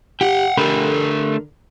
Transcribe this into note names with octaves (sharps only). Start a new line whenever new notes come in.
G4 F#5 G5
D3 A3 G4 A4 A#4 B5